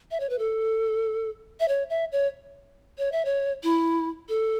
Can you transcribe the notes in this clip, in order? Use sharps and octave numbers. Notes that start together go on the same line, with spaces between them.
E5
C#5
B4
A4
E5
C#5
E5
C#5
C#5
E5
C#5
E4
A4